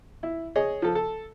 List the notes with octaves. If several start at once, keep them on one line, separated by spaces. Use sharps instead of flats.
E4
G#4 C#5 D#5
F3 A4
A4